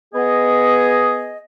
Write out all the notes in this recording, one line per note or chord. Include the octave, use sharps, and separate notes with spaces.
B3 G#4 D#5